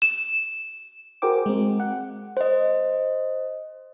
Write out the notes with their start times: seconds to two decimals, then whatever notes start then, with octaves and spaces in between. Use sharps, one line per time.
0.02 E7
1.22 F#4 G#4 A#4 C5 G5 D6
1.46 G#3 C4
1.80 F#5
2.37 C5 D#5